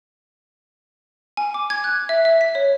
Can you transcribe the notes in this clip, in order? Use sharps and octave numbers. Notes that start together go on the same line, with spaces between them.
G#5
D6
G#6
F#6
E5
E5
B6
C#5